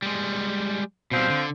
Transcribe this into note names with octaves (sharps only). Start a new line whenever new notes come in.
G3 G#3
B2 F3 G3 C4
D3